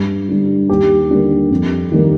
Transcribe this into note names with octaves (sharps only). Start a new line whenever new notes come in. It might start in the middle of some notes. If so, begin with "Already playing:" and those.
Already playing: G2
D3 G3
D#2 G4
D3 G3 A#3
F2
D#3 G3 A#3